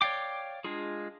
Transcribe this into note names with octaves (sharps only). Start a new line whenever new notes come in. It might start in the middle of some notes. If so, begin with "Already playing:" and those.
C#5 D5 F5 G5 D6
G#3 D4 F4 G#4